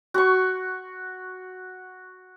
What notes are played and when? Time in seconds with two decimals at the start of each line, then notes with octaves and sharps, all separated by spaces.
0.14 F#4 C#6